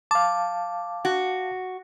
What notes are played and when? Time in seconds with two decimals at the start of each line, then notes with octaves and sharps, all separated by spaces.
0.11 F5 A5 D6
1.05 F#4